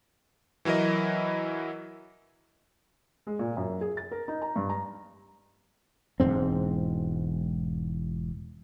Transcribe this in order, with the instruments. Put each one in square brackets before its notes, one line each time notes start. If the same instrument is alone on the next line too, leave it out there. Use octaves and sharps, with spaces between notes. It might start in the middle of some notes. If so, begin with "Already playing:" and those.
[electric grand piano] E3 F#3 E4 A#4 D#5
[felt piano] G#3
A#2
F#2
G#4
A6
A#4
D#4
A#5
G2
A#5
[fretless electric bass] E1 A#1 G#2 C4